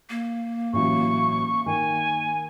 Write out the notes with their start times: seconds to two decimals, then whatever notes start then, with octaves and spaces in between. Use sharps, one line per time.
0.10 A#3
0.73 A1 E3 F#3 C#6
1.66 D#3 G#5